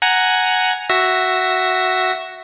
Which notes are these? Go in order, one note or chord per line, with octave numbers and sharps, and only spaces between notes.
F#5 G#5 A#5
F#4 E5 A#6